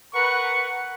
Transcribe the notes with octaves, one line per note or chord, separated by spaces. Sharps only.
A#4 B4 F#5 C#6